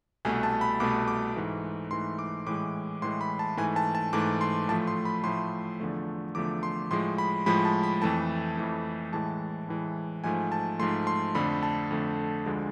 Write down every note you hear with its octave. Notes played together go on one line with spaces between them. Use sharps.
C2 B2 A3 G#5
A5
B5
C2 B2 A3 D6
D6
G#2 E3 A3
G#2 E3 A3 C6
D6
A2 E3 G#3 D6
A2 E3 G#3 C6
B5
A5
G#2 E3 A3 G#5
A5
A5
G#2 E3 A3 D6
C6
A2 F3 A3 A5
C6
B5
A2 F3 A3 C6
E2 D3 F3 A3
E2 D3 F3 A3 D6
C6
A2 F3 G#3 C6
B5
A2 F3 G#3 B5
A5
B5
F2 E3 A3 A5
F2 E3 A3
A2 E3 G#3 A5
A2 E3 G#3
G#2 F3 A3 G#5
A5
G#2 F3 A3 C6
C6
F2 D3 A3 B5
A5
F2 D3 A3
D2 D3 F3 G#3